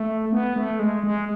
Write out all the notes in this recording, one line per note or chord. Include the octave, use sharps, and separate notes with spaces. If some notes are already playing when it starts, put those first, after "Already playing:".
Already playing: A3
B3
A3
G#3
G#3